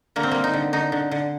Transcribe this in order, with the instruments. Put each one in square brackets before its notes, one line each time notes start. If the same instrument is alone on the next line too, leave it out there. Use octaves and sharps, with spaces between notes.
[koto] D3 A#3
C4
G3 A#3
D#4
D3
D3 D#4
D3
D3